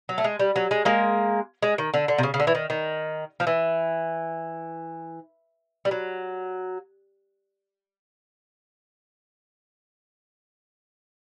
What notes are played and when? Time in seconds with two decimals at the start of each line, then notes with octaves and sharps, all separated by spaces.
0.09 F#3
0.18 A3
0.24 G#3
0.39 G3
0.56 F#3
0.71 G#3
0.85 G#3 A#3
1.62 G#3
1.78 D#3
1.94 D3
2.08 D3
2.18 C3
2.23 C#3
2.34 C#3
2.40 D3
2.47 E3
2.55 D#3
2.70 D#3
3.40 F3
3.47 E3
5.85 G3
5.91 F#3